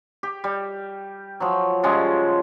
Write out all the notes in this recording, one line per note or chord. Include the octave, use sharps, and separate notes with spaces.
G4
G3
F3 F#3
C#3 F3 G3 G#3